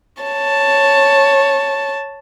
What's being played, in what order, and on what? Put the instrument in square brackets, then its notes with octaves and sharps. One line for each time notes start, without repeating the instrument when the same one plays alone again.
[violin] C#5 A5